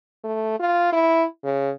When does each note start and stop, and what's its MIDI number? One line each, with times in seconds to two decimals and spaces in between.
0.24 0.57 57
0.60 0.92 65
0.92 1.25 64
1.44 1.71 49